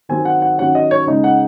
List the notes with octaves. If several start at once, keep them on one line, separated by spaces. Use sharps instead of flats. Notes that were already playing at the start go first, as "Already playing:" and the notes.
D#3 F#3 C4 G#5
F#5
F#5
D#3 F#3 C#4 F#5
D#5
C#5
C#3 G#3 D#4
F#5